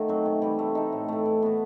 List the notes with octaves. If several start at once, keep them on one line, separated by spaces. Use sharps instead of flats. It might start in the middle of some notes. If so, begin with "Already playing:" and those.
Already playing: D#3 A3 F#4 A4
F#3 C4
C3
E3 G3
A3
D#4 A4
A2
E3 A3
E3
B3 F#4